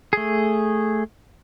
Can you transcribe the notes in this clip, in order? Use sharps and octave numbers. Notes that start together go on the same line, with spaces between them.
A3 G#4